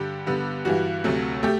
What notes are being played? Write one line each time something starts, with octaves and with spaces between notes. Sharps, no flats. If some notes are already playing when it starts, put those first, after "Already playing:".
Already playing: G2 D3 G3 G4
G2 D3 G3 B3
G2 E3 G3 F#4
D2 C3 F#3 A3
A3 G4